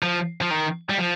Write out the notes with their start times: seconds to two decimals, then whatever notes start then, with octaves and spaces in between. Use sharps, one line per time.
0.03 F3
0.41 F3
0.51 D#3
0.90 G3
0.98 F3